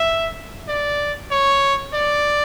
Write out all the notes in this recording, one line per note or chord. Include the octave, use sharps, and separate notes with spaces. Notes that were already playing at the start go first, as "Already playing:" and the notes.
Already playing: E5
D5
C#5
D5